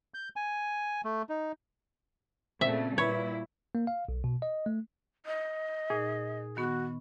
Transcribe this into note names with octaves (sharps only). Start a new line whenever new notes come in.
G6
G#5
A3
D#4
A#2 C#3 A3 C4 E5
A#2 G3 E4 B4 C#5
A#3
F5
B1
B2
D#5
A3
D#5
A#2 D#4 G#4
D#3 B3 F#4 C#6